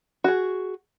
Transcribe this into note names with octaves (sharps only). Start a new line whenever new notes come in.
F#4 G#4